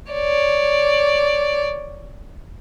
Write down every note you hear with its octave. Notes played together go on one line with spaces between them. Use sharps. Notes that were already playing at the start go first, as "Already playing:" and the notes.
C#5 D5